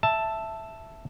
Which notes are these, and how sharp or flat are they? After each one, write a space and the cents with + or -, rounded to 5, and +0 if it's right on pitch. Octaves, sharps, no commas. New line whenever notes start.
E5 +5 A5 +0